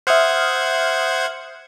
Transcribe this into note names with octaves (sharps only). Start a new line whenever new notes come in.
C5 E5 F#5 D#6 F6 G#6